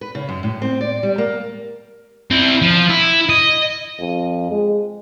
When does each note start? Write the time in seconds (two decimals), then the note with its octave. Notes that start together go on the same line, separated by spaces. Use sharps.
0.01 B4
0.15 C#3
0.29 F#2
0.43 A2
0.62 C4
0.81 D5
1.03 G3
1.18 A#3
2.31 C4 E4
2.62 F3
2.89 E4
3.29 D#5
3.99 F2
4.51 G#3